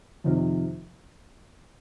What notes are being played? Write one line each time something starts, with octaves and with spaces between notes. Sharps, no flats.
F2 C3 D#3